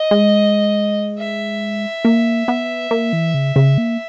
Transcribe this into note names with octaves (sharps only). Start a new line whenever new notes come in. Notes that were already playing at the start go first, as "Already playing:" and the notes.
Already playing: D#5
G#3
E5
A#3
B3
A#3
E3
C#3
C#3
A#3